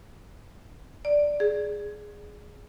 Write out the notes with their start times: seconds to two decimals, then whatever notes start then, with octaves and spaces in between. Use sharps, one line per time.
1.05 D5
1.40 G#4